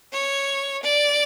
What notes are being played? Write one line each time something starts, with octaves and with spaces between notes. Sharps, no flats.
C#5
D5